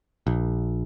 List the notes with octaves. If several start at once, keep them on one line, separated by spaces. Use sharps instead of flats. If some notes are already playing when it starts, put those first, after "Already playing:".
A#1